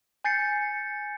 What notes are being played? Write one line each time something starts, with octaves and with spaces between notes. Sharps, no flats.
G#5 G6 A6 C7 C#7